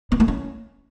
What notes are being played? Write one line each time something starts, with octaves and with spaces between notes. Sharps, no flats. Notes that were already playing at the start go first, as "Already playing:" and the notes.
B3
A3
C#4